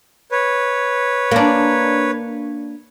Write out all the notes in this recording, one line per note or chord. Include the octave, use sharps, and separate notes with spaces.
B4 C#5
A#3 D4